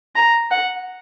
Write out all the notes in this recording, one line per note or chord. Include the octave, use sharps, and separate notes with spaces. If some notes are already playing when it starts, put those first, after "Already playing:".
A#5
F#5